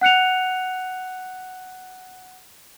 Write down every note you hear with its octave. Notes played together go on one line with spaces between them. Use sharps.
F#5 F#6 C#7 F7